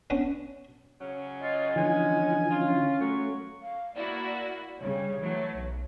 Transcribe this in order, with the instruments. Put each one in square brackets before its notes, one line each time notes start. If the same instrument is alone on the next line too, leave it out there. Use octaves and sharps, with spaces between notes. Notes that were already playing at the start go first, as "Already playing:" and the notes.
[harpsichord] B3 C#4 D4
[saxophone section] C#3 F#3 C#4
[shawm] F4 [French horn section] D#5
[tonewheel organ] D3 E3 F3 [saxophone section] G#3 B3 C#4 [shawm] G#5
[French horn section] C#4 [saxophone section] F4
[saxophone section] F#3 [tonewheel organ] A3 [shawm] C#6
[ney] F5
[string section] A#3 E4 F#4 [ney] D5
[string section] C#3 G3 [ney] C#5
[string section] E3 F#3 A3
B1